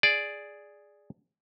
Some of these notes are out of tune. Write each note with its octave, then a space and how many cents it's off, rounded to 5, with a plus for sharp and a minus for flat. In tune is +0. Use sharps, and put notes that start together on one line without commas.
G#4 +0 D5 +0